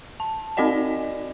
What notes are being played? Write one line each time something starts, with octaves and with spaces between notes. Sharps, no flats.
A5
C4 D#4 F#4 D5 D#5 G#5